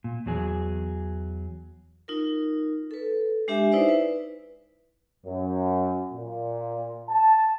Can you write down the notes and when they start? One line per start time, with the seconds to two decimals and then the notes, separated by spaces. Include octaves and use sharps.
0.04 A#2
0.26 E2 F#3 G#4
2.08 D#4 F4 A#4
2.91 A4 B4
3.48 G#3 D4 G4 E5 G#5
3.72 D#4 E4 B4 C5 D5 E5
3.89 B4
5.26 F#2
6.13 A#2
7.08 A5